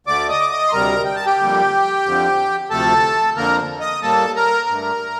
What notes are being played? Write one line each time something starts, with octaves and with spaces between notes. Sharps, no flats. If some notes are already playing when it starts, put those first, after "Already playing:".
D2 D3 A3 D5 D6
D#5 D#6
D6
D#5 D#6
C6
D2 C3 G3 A#4 A#5
G5
A5
G4 G5
F2 D3 G3 A#3
F2 D3 F3
D2 C3 F3 A3 A4 A5
F2 D3 F3 A#3 A#4 A#5
D#5 D#6
A2 G3 A#3 A4 A5
A#4 A#5
G2 D3 A3